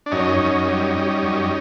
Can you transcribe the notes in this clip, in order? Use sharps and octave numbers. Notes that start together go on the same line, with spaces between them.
D4
F#2 C#4 D#4
F#2
G3
G3
F#2